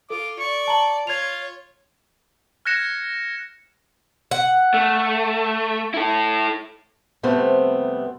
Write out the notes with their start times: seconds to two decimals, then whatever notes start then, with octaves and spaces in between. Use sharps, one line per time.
0.10 F4 A4 D6
0.39 D5 C#6
0.68 A5 A#5 F#7
1.07 F4 C#5 G#6 F7
2.65 F6 F#6 G#6 A#6 C#7 E7
4.31 F#5
4.74 A3
5.94 E4 A4
7.23 F2 C3 G3 A3 B3 C4